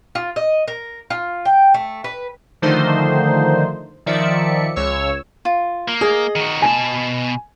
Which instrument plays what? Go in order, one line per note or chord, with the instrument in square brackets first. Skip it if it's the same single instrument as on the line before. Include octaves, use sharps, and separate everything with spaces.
[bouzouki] F4
D#5
A#4
F4
G5
A3
B4
[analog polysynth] D3 D#3 F3 A3 D#4 C5
D#3 F3 D5 E5 C#7
C#2 C#5 E6
[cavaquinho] F4
[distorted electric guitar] A#3
[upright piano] G#4 [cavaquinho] D#5
[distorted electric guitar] D#3 F#4
[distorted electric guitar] B2 A5 [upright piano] G#5